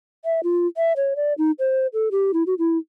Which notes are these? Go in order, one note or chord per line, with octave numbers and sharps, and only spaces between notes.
E5
F4
E5
C#5
D5
D#4
C5
A4
G4
E4
F#4
E4